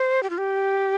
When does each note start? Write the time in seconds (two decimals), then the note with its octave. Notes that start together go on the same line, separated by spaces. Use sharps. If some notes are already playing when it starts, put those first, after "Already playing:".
Already playing: C5
0.23 G4
0.30 F4
0.38 G4